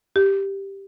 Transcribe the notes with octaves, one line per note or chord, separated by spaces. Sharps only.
G4